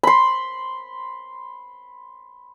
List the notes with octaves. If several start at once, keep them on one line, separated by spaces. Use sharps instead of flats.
B5 C6